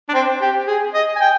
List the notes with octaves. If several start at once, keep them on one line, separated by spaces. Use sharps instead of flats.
D4
C4
G4
G#4
D#5
G#5
G5